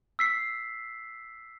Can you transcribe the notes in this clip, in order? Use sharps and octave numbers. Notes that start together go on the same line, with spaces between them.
E6 B6 C7